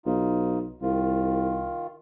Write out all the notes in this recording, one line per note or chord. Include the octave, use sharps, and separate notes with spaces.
B1 D#4 F4
C2 D#3 F4